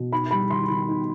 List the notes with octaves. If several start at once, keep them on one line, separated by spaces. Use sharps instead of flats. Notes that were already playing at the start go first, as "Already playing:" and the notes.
Already playing: B2
D#4 B5
G3 B5
D#3 C6
D#3
D#4